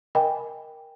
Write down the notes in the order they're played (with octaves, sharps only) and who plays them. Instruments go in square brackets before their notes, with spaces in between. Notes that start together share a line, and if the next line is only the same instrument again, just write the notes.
[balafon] A#4 D#5 G5 G#5 B5